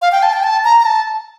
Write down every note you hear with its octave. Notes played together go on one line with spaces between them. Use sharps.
F5
G5
A5
G5
A5
A#5
A#5
A5